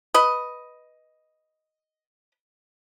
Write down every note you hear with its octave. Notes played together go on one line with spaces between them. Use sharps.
B4 D#5